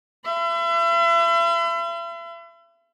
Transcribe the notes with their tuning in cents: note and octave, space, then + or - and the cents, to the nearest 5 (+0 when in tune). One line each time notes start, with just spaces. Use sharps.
E5 +40 B5 +45